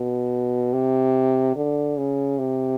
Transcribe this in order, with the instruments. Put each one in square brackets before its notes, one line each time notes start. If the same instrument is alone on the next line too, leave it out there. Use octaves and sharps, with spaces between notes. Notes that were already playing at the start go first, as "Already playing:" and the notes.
Already playing: [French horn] B2
C3
D3
C#3
C3